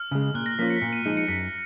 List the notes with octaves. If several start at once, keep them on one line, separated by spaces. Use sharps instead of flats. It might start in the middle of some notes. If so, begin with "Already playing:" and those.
Already playing: F6
C#3 G#3
A#2 F#6
A#6
F3 A#3 C#4 F4 B6
C#7
B6
A#2 C#7
D#7
F3 G#3 D#4 C#7
C#7
F#2 B6